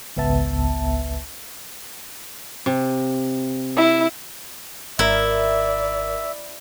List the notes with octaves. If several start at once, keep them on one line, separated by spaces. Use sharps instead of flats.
G#1 C#2 B3 E5 A5
C3
E4
G#1 E4 A#4 D5 E5